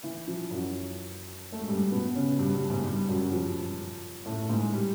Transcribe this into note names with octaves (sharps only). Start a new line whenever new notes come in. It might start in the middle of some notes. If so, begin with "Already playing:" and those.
E3
F3
F#2 F#3
A3
G#3
G2 G3
B2 B3
C#3 C#4
G2 G3
G2 G3
G#2 G#3
G2 G3
F#2 F#3
F3
A2 A3
G#2 G#3
G3